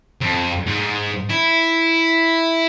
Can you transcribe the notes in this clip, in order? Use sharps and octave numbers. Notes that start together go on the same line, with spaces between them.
F2
G#2
E4